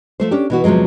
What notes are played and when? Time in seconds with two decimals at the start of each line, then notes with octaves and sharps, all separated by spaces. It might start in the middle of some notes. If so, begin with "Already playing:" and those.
0.20 F3 A3 C5
0.31 C#4 D4 G4
0.50 B2 E3 F#4
0.64 E2 C3 F3 F#3 G#3